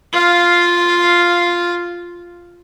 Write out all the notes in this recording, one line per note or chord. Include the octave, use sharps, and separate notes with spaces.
F4 F5